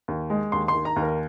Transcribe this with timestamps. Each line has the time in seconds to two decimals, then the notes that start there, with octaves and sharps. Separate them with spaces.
0.08 D#2
0.30 G#3
0.52 D#2 C6
0.68 C6
0.74 D#3
0.85 A#5
0.96 D#2
1.02 A#4